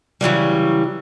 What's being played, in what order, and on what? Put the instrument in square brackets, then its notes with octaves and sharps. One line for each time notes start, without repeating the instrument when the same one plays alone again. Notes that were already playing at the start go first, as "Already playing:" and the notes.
[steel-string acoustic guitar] C#3 E3 F#3 G3